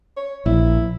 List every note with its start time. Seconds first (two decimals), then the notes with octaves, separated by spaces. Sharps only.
0.16 C#5
0.46 A#1 E4